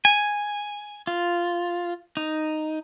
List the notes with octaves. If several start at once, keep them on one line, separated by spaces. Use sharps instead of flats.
G#5
F4
D#4